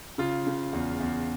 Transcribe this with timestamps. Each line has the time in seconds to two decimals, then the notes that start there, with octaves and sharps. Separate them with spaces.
0.18 C#3 F4
0.47 C#3
0.73 E2
1.00 E2